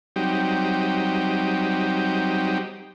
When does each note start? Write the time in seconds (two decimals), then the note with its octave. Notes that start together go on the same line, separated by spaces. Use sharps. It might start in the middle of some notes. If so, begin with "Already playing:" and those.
0.16 F#3 G3 C4 D#4 G4